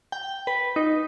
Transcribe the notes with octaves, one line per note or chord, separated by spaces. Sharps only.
G5
B4
D#4